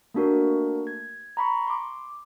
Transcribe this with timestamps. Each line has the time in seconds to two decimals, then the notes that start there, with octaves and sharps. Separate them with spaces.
0.14 A3 A#3 D4 F#4 A#4
0.87 G#6
1.37 A#5 B5 C#6
1.67 C6 D6